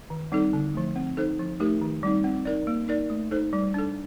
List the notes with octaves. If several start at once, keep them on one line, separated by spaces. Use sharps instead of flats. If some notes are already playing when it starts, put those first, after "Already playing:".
D#3
G3 C4 D#4 A4
D3
F3 A3
C4
D#4 A4 C5
F3
A3 D#4 G4 A#4
D#3
G3 C4 D#4
C4
D#4 A#4 D5
A#3
D#4 A#4 D5
A3
D#4 A4 C5
G3
D4 A4